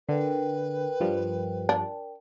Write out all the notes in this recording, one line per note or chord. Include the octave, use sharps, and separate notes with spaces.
D3 A#4 B4 G5
G2 F3 G3
D4